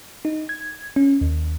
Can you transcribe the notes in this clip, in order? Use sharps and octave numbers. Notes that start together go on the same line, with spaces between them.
D#4
G#6
C#4
D#2